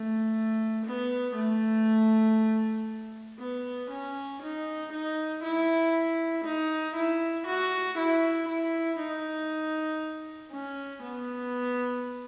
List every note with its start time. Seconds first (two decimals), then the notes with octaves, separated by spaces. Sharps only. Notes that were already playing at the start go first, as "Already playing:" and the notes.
Already playing: A3
0.85 B3
1.35 A3
3.39 B3
3.90 C#4
4.42 D#4
4.92 D#4
5.43 E4
6.44 D#4
6.96 E4
7.47 F#4
7.98 E4
8.48 E4
8.99 D#4
10.51 C#4
11.02 B3